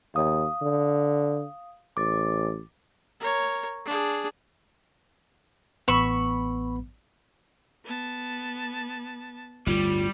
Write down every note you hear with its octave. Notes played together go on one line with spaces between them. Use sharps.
D#2 F5 D#6
D3
A1 D6 A6
A#4 C#5
D4 G#4
A1 B3 B5 C#6 E6
B3 A5
G1 D2 A2 G3 F4